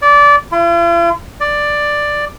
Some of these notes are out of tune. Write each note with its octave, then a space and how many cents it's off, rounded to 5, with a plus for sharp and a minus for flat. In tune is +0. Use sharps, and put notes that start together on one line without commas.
D5 -20
F4 -45
D5 +5